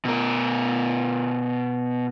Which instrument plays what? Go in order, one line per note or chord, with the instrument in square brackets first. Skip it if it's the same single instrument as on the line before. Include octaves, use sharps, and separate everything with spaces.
[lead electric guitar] B2 A#4